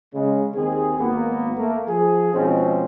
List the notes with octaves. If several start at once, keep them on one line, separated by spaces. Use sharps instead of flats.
C#3 G#3
D#2 D#3 C4 G#4
G#1 A#3 B3
A3 A#3
F3 G#4
B2 F3 G#3 C4 C#4 D#4